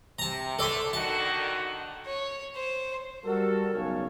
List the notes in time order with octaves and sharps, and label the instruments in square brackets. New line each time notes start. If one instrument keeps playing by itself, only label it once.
[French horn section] C3 [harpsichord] A5 A#5
[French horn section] D3 A3 [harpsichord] A4 D5 C6
[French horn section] D3 D#3 F#4 [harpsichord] A5
[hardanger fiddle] C#5
C5
[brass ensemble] G3 F#4 A4 [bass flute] A#4
[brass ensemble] B1 C#3 C#5